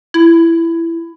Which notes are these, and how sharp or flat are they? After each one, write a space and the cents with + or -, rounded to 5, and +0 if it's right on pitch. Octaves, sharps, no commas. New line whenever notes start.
E4 +15